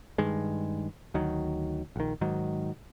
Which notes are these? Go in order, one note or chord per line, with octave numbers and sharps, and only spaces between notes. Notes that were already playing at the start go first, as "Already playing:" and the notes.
G2 D#3 G#3
D2 D#3 F#3
A#1 D#3
G#2 D#3 F#3